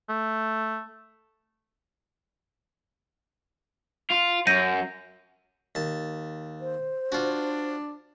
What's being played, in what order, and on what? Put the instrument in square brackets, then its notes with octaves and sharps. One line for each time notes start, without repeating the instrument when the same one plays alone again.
[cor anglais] A3
[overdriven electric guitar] F4
[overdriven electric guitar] F#2 [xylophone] G6 A#6 D#7
[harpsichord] D#2 A5
[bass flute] C5
[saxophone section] D4 [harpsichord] F4 F#4